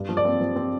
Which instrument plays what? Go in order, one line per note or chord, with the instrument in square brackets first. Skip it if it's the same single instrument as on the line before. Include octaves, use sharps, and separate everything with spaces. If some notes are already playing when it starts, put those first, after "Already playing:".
Already playing: [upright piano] G2 D4
F3
D5
C4
F3
C4